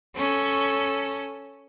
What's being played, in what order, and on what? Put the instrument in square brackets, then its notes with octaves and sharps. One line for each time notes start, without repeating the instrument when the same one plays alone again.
[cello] C#4 A4